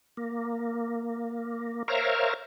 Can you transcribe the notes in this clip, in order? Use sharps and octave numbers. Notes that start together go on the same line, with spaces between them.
A#3
A#4 C5 C#5 E5 F5 A#5